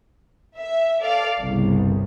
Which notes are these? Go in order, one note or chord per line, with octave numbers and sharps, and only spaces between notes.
E5
A4 D5 F5
G1 C2 C#3